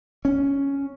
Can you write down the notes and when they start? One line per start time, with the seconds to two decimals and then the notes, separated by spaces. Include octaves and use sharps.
0.25 C#4